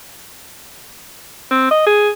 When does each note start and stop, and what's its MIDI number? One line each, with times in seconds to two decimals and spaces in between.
1.51 1.67 60
1.71 1.82 75
1.86 2.10 68